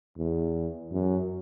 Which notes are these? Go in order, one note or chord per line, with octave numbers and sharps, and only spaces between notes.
E2
F#2